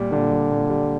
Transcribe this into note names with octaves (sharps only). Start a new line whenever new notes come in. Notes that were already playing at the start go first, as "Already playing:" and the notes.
Already playing: A#2 G3
A#2 D3
G3
A#2
G3